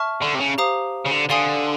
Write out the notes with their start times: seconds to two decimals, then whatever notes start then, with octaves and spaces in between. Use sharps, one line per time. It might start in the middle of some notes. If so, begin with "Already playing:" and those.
Already playing: E5 A5 C#6 F6
0.22 D3
0.35 C3
0.40 C#3
0.58 G4 C5 F5 A#5 D#6
1.06 C#3
1.12 D3
1.30 D3 D5 F5 G#5 C6 D#6